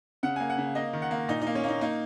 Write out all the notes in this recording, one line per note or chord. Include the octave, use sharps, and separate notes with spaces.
C#3 F#5
A#3 G#5
F#5
C#3
A#3 D#5
D#3
F#5
A#3
A#2 D#4
D#4
A#3
C#4
A#3 D#4
A#3 D#4